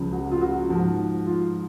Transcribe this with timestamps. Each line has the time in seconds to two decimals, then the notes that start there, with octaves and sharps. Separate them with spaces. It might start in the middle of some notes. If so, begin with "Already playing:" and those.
Already playing: C#2 C#3 F3
0.12 F#4
0.31 F4
0.41 F#4
0.69 G#2 F3
1.26 F4